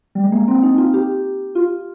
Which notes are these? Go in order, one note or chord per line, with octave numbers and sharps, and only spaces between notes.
G3
G#3
A#3
C4
D#4
F4
G4
F4